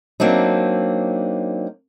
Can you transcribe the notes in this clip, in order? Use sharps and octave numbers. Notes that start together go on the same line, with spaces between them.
F#3 A#3 C4 D4 D#4